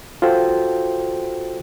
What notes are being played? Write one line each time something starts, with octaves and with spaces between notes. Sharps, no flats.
F4 F#4 A4 C5 G5